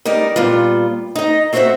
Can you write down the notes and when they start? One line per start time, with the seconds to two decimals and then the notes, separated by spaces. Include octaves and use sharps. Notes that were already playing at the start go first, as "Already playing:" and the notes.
0.05 G3 D#4 A#4 D5
0.36 A#2 G3 B3 F4
1.16 D#4 D#5
1.53 C4 F#4 C5 D#5 E5 F#5